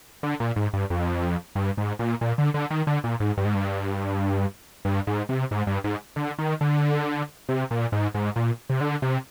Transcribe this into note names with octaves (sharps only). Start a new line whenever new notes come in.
D3
A#2
G#2
G2
F2
G2
G#2
A#2
A#2
D3
D3
D#3
D3
A#2
G#2
G2
G#2
G2
G2
G#2
C3
G#2
G2
G#2
D3
D#3
D3
C3
A#2
G#2
G#2
A#2
C3
D3
C3